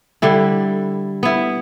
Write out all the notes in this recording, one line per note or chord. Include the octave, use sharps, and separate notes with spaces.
D3 G3 E4
B3 E4